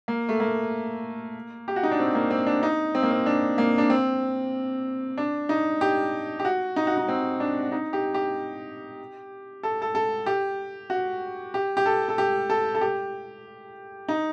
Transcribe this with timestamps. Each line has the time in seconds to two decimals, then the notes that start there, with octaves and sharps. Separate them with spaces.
0.08 A#3
0.29 A3
0.40 A#3
1.68 G4
1.76 F#4
1.83 D#4
1.91 D4
1.99 C4
2.15 A#3
2.31 C4
2.46 D4
2.63 D#4
2.95 C4
3.03 A#3
3.11 C4
3.26 D4
3.58 A#3
3.78 D4
3.90 C4
5.18 D4
5.49 D#4
5.81 G4
6.39 G4
6.45 F#4
6.76 D#4
6.87 F#4
6.97 D#4
7.08 C4
7.40 D4
7.72 D#4
7.93 G4
8.14 G4
9.63 A4
9.82 A4
9.95 A4
10.26 G4
10.90 F#4
11.54 G4
11.77 G4
11.86 A4
12.09 A4
12.18 G4
12.50 A4
12.75 A4
12.81 G4
14.08 D#4